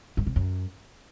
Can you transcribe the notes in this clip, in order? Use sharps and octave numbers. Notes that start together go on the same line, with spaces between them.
G2
C3
F#2